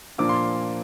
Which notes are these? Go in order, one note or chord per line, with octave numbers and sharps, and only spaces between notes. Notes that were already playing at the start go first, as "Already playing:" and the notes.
A#2 F3 A#3 D4 D6
C6